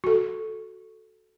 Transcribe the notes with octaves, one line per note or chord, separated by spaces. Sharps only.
F#4 A4